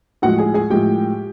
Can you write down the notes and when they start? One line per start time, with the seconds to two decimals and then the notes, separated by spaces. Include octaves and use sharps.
0.22 A2 F3 G#3 F#4 F#5
0.38 G#4 G#5
0.54 G#4 G#5
0.70 A2 F3 G#3 G4 G5